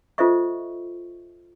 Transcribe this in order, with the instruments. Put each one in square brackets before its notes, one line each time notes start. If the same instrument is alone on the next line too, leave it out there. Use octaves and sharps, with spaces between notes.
[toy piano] F4 A4 C5 D#5 E5 C#6